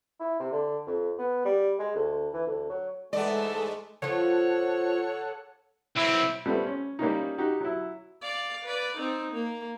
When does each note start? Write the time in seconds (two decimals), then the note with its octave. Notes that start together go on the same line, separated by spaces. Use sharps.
0.20 E4
0.39 C3
0.52 D3
0.86 F2
1.18 B3
1.45 G3
1.79 G#3
1.95 D2
2.33 E3
2.46 D2
2.69 F#3
3.13 G#2 E3 G#3 A3 B3 A4 D5
4.02 F3 F4 A4 C#5 F#5
5.96 B1 C4 E4
6.46 G3 A3 B3 C4
6.66 C#4
6.99 G3 A#3 C#4 D#4
7.38 D#4 F#4 G4
7.60 F#3 E4
8.22 D5 F5
8.65 B4 D5
8.97 C4 D#4
9.33 A#3